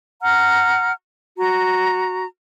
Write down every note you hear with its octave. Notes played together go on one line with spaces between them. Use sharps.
F#5 A#5 F6
F#4 A#5